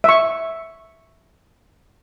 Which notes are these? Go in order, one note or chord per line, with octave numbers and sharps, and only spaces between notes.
E5 C#6